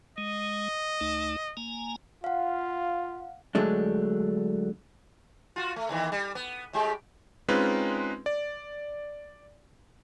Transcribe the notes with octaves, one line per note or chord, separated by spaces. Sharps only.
G#3 D#5
D2 A3 D#4
A#3 G#5 A#5
F4 F5 F#5
D3 F#3 G#3 A3 D4
F4 F#4
A3
D#2 D#3 E3
G3
B3
A2 G#3 G4
G#3 C4 C#4 D#4 F4 B4
D5